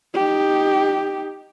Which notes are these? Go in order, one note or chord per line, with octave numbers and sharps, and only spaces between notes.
D#4 G4